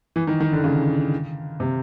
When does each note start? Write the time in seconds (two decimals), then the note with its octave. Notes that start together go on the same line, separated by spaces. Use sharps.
0.16 E3
0.27 D#3
0.40 D#3
0.52 D3
0.64 C#3
1.60 C3